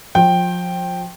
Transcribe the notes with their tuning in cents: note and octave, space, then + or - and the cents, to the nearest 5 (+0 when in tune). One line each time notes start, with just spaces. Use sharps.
F3 +30 G5 +0